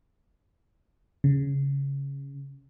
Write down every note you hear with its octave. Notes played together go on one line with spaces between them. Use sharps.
C#3